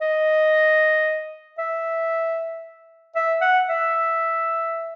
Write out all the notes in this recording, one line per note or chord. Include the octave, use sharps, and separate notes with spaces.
D#5
E5
E5
F#5
E5